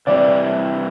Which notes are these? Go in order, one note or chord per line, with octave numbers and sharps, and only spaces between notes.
C3 E3 G3 D5